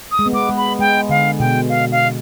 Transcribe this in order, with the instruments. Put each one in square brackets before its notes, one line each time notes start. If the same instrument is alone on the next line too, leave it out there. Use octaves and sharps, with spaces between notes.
[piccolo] D#6
[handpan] G#3
B3
[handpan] G#3 [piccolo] D6
[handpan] G#3
[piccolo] B5
[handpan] G#3 [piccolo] G5
[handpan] D3 [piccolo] F5
[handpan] B2 [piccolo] G5
[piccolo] F5
F5